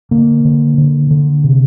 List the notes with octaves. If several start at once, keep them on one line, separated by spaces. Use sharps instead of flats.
D3 A#3
D3
D3
D3
C3